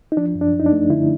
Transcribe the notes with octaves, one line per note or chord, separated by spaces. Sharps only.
D#4
F3 D4
F#2
D4
F#2
D#4
D4
A3
D3 E4